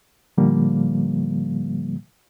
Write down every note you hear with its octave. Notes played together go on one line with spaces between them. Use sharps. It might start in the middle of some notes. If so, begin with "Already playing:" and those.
A2 D3 F3 G3 A#3